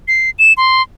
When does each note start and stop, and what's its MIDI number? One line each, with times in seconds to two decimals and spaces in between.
0.08 0.30 96
0.39 0.53 100
0.57 0.82 84